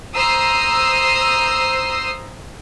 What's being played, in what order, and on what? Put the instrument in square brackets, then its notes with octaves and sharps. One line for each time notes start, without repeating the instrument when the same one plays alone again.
[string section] C5 A#5 D#6 E6 C7